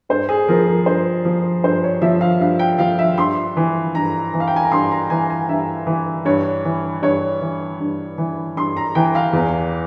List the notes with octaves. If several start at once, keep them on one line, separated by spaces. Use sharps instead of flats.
G2 C5
G#4
F3 A#4
A#4
G2 C5
F3
G2 C5
C#5
F3 E5
F5
G2 F5
G5
F3 F5
E5
G2 C6
E3
G2 A#5
E3
F5
G5
G#5
A#5
G2 C6
A#5
E3 G#5
G#5
G2 E5
E3
G2 C#5
E3
G2 C#5
E3
G2
E3
G2 C6
A#5
E3 G5
F5
E2